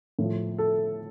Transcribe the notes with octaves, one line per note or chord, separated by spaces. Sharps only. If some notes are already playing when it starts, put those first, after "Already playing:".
A2 F3
A4